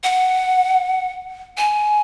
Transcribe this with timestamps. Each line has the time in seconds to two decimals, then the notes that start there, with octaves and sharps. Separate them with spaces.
0.04 F#5
1.58 G#5